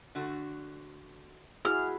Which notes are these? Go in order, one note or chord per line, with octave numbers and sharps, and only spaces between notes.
D3 A3 F#4
E4 F#4 G#4 F6